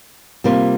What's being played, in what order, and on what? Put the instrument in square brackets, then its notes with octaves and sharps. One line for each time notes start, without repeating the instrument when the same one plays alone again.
[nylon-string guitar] C3 G3 A#3 F4